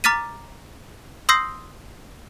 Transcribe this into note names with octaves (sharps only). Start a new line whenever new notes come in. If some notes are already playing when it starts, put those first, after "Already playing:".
A#5 D6 F6 A6 B6 D#7
C6 D#6 E6 G6 A#6 C7